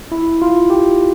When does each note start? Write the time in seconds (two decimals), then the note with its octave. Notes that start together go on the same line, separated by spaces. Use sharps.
0.12 E4
0.42 F4
0.70 G4